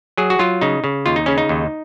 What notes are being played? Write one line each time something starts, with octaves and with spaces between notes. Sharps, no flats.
F#3 G#4
F#4
F#3 F4
C#3 D#4
C#3
D#2 F4
D#4
C#3 C#4
D#4
D#2